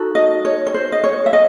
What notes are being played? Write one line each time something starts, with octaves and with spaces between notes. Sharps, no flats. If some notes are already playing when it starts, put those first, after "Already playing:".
Already playing: D#4 F#4 A4
D#5
C#5
C#5
C5
D#5
C#5
E5
D#5